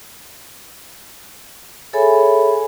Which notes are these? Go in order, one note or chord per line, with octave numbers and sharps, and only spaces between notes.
G#4 A4 C#5 E5 G#5 B5